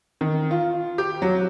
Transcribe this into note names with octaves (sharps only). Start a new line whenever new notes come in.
D#3
F4
G4
F#3